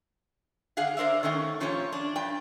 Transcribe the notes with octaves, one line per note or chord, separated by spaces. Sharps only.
D3 G#4 F5 F#5
D4 A#4 C5 D5 E5
D#3 A3 C#4 G5
A#2 F3 C#4 G4 A#4 C#5
D4
G2 G5